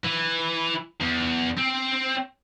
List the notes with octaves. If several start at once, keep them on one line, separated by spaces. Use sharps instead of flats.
E3
E2
C4